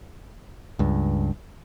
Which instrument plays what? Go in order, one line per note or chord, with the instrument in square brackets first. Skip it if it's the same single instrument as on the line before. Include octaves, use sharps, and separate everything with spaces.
[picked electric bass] C#2 G2